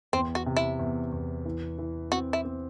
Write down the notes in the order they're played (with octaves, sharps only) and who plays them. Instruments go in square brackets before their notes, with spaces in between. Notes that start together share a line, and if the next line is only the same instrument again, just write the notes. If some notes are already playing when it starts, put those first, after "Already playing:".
[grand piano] E2 [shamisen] C4
[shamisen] F#4
[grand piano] C3
[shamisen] E4
[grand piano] E2
E2
E3
E3
[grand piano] C4 [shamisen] F#4
[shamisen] E4
[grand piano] C4